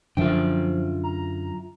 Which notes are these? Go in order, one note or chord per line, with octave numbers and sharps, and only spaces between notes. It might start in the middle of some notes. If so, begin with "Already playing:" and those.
F#2 D3 F3 F4 E5 G5
A#5